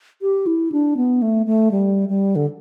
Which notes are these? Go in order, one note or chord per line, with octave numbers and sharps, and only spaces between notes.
G4
E4
D4
B3
A3
A3
G3
G3
D3